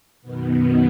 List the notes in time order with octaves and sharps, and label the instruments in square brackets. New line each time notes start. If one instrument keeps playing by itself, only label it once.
[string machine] F#2 B2 D#3 B3